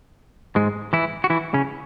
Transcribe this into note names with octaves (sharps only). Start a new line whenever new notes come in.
G#2 G#3
E3 E4
F#4
E3 E4
C#3 C#4